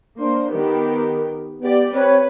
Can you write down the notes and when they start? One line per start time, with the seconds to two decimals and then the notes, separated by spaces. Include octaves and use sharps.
0.20 A#3 D4 C5
0.52 D#3 B3 G4 A#4
1.62 B3 G4 D5
1.94 C4 B4 C#5